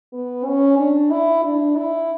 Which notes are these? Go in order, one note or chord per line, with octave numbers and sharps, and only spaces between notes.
B3
C#4
D4
E4
D4
E4